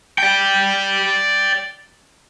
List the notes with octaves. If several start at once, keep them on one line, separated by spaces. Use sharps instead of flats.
D5 G5